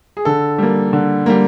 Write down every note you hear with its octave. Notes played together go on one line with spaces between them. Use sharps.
G#4
D3 A4
G3 A#3
D3
G3 A#3